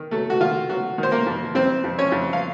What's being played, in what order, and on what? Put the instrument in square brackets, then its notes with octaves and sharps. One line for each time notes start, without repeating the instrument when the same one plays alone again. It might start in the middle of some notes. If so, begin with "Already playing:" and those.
Already playing: [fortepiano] D#3
F#3 A3 A4
F#4
D#3 F4
F#3 F#4
D#3
C5
A#3 A#4
F2
F2 C4 C5
F2
C#4 C#5
F2
F5